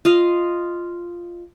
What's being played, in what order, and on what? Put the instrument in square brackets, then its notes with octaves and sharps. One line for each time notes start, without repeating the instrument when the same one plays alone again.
[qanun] F4 D#5 F5